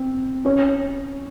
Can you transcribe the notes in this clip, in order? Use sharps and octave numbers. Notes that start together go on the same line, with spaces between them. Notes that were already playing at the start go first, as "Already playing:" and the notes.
Already playing: C4
C#4 C#5